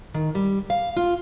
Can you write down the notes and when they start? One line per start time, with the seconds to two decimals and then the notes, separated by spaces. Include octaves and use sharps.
0.14 D#3
0.35 G3
0.70 F5
0.97 F4